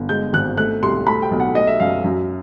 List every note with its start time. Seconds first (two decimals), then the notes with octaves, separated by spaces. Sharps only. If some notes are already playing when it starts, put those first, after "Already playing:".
Already playing: G1
0.09 G#3 G6
0.33 G#1 F#6
0.57 A3 F#6
0.83 C2 C6
1.07 A3 B5
1.22 G5
1.31 B1
1.40 F#5
1.55 A3 D#5
1.67 E5
1.80 F#2 F5
2.04 F#2